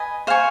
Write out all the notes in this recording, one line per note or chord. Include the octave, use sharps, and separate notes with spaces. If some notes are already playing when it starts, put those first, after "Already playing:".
Already playing: B4 D#5 G#5
C5 F5 G#5 C#6